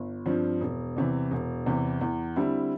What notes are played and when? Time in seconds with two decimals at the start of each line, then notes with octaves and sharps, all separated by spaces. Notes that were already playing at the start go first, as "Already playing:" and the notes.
Already playing: G1
0.26 G2 F3 C4
0.61 E1
0.96 E2 C3 E3
1.31 E1
1.66 E2 C3 E3
2.01 E2
2.36 D3 G3 C4 E4